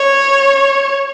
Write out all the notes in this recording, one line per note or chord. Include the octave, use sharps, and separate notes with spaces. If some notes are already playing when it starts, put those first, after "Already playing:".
Already playing: C#5